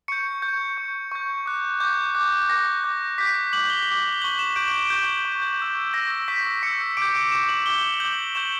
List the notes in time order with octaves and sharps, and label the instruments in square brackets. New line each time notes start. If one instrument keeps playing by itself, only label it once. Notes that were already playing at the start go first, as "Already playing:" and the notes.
[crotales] C#6 G6 C#7
C#6 G6
C#6 G6
C#6 G6
D6 F#6
D6 F#6 G6
D6 F#6
D6 F#6 A#6
D6 G6
D6 G6 B6
D6 G6 F#7
G7
D6 G6
G7
G6 F#7
C#6
E7
C#6 G6 D7
D7
C#6 G6
C#6 G6
G6
C#6 E6 G6
C#6 E6 G6 A#6
C#6 E6 G6 B6
C#6 E6 G6 C#7
D6 G6 D7
D6 E7
G6
F#7
D6 G6 G7
D6 G6 F#7
C#6 G6 E7